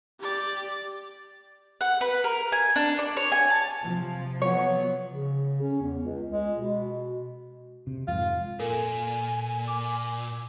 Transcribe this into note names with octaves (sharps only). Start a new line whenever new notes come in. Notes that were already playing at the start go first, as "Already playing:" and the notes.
G4 D5
F#5
B4
A#4
G#5
D4
D5
C#5
G#5
A5
C3 F3
F#3 B3 C#5
C#3
C#4
E2
C#2
G#3
B2
C3
F2 G#2 F4
A#2 A4 A#4 G#5
D6